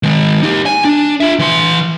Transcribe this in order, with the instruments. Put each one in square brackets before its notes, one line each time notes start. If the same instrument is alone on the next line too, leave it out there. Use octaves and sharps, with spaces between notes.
[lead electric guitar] D#3 G#3
D#4 G4
G#5
D4
F4 E5
E3 C6